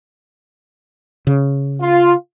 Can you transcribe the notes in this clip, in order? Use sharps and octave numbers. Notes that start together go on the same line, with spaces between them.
C#3
F4